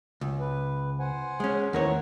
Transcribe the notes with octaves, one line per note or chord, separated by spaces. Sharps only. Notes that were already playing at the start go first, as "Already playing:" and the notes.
C#2
B4
C5 F#5 G#5
G#3 C#4
D#2 A2 B3 A#4 C#5 F#5